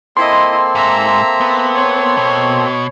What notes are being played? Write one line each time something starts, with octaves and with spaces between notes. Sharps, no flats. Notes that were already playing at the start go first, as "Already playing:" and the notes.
A#3 C4 E4 A4 D#5 C6
G#2 E5 A#5
B3
C#5
B2